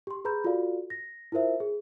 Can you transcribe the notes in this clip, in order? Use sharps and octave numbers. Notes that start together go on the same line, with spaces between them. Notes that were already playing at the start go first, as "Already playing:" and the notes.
G4 C6
G#4 B4 A#5 B5 G6
F4 F#4 A4 D5 F5
A#6
E4 F4 A#4 C5 E5
G#4